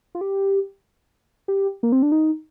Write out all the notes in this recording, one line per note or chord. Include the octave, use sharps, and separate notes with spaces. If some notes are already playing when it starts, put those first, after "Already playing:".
F4
G4
G4
A#3
C4
D4
D#4